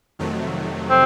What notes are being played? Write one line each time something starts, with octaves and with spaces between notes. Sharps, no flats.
F2 C3 D#3 F#3 A3
C4